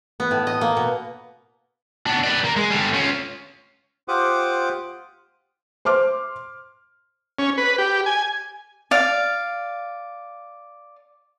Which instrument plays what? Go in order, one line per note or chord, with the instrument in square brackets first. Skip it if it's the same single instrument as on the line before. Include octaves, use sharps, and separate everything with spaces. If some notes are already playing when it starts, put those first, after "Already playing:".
[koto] B3
A2
D#5
A#3
B2
[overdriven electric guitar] B3 D4
B4 D5
A#3
G#3
D3 G3
C#4 F4
[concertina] F4 G4 C5 F#5 D6 D#6
[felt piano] C5 C6 D6 F6
[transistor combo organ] C#4
B4
G4
G#5
[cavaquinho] D5 F5